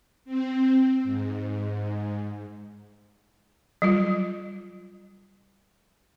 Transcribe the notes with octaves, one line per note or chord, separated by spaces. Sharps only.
C4
G#2
F#3 G3 F4